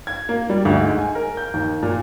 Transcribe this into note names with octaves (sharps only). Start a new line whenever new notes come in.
G#6
A#3
G3
D2
G#2
G#5
A#4
G6
D#2
A#2